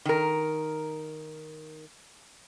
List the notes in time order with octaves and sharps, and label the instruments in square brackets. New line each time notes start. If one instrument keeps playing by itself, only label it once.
[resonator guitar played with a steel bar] D#3 A#4